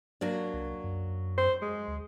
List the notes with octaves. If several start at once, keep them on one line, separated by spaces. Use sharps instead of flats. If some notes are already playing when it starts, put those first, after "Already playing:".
F#3 A#3 D4
C2
F#2
C5
G#3
D2